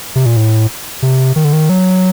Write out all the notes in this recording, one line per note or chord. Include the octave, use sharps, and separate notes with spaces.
C3
A#2
A2
C3
D#3
D3
D#3
F#3